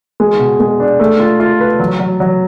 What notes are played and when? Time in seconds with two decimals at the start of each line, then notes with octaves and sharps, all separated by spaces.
0.20 G#3
0.39 B2
0.60 G#3
0.80 D4
1.00 A3
1.20 F4
1.40 F4
1.60 B4
1.80 F#3
2.00 F#3
2.20 F#3